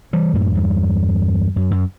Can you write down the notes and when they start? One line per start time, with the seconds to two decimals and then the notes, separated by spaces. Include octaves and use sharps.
0.13 E3 G3
0.33 F#2 A2
0.53 E2 G2
1.56 F#2
1.71 F#2